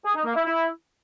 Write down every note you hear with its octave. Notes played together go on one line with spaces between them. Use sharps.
G#4
D#4
A#3
E4
E4